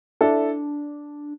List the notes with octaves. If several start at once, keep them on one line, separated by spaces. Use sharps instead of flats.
D4 E4 A4